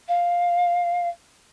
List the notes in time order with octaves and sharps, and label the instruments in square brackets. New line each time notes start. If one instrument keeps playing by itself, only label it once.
[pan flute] F5